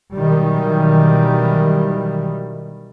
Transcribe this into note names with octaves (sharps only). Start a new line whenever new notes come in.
B2 D#3 E3 F#3 G3